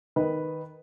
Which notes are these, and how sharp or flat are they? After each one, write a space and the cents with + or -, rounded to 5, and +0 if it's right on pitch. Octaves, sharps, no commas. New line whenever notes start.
D#3 +0 B4 +0 D#5 +0